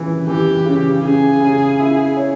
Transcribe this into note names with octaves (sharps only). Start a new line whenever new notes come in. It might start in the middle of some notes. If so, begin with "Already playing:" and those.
Already playing: C#3 E3
E3 G4
C#3
C#3 G#4
C#3
E4
C#5